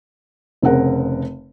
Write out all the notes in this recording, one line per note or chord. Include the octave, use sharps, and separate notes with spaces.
F1 C#3 C4 A#4 F#5